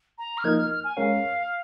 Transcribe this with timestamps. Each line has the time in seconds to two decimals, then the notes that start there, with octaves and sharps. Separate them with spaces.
0.18 A#5
0.38 F6
0.44 F3 A#3 D#4 A#4 D#5 G#6
0.58 F6
0.71 F6
0.84 G#5
0.97 G#3 C#4 A#4 C#5 F5